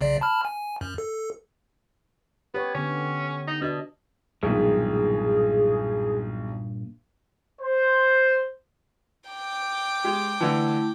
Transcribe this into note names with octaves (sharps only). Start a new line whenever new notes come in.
B1 C#3 D5
A5 B5 F6
G#5
F#2
A4
B3 G4 C#5
D3 B3 C#4
D#4
B2 D4 D#5
B1 G2 A#2 D#3 G#3 G#4
C5
G5 D6
G#3 G4
D3 E3 A3 E4